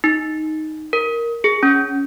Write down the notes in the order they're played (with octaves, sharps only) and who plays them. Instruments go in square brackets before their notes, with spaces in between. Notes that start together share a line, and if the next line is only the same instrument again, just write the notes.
[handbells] D#4
A#4
G#4
C#4